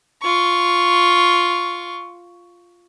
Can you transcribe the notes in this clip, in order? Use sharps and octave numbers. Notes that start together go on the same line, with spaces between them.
F4 C#6